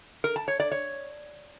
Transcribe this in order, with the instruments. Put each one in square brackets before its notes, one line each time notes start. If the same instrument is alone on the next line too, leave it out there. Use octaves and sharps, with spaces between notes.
[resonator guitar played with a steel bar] A#4
A5
C#5
D5
C#5